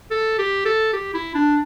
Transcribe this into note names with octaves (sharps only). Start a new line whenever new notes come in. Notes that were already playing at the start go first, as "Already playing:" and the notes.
A4
G4
A4
G4
E4
D4